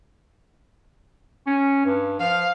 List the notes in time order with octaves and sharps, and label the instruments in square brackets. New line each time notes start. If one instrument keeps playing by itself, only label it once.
[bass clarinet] C#4
G2
[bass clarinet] F3 [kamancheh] F5